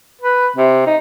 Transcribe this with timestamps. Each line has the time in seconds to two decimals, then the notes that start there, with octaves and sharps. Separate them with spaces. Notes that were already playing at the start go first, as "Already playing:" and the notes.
0.21 B4
0.56 C3
0.86 D#4